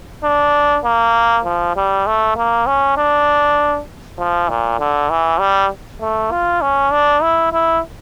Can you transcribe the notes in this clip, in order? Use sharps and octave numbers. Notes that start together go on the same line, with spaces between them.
D4
A#3
F3
G3
A3
A#3
C#4
D4
F3
A#2
D3
E3
G3
A3
F4
C#4
D4
E4
E4